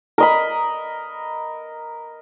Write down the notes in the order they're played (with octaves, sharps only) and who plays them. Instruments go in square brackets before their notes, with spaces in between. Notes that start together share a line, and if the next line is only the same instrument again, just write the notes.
[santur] A#4 D#5 B5